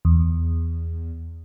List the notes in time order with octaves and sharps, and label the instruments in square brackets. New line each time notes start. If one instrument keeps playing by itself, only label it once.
[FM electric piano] E2